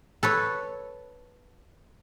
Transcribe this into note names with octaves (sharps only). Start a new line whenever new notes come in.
A4 B4 C#5